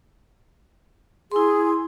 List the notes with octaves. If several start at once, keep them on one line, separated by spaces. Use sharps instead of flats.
E4 G#4 C6